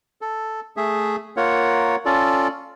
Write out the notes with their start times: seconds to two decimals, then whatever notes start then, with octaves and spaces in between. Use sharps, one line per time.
0.21 A4
0.77 A3 G#4 E5
1.37 A#3 F4 A#4 C#5 F#5
2.05 C#4 F4 A4 D5